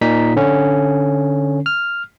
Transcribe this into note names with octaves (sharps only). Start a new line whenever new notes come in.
A#2 D#4 B6
D3 C#4
F6